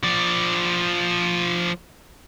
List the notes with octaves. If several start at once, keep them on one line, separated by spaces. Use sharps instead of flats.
F3 D5